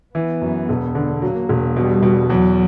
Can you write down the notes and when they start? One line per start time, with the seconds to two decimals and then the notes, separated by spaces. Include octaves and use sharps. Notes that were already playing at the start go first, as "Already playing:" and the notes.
0.15 E3 B3
0.42 F#2
0.69 E1
0.95 D3
1.22 F#3 A#3
1.49 E1
1.76 B2 G3
2.02 B2
2.30 E2 F#3